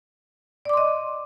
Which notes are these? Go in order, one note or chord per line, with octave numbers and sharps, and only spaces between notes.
D5 D#5 C6 D6